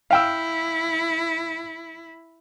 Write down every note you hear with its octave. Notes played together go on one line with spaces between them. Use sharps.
E4 F5 G5 E6